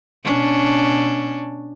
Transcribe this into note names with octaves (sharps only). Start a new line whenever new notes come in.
B2 C#4 D4